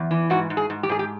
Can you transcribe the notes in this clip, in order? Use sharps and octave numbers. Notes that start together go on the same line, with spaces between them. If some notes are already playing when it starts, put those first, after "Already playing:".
Already playing: E2
E3
G#2 F#4
G#2
G#4
G#2
G4
G#2 G#4
G4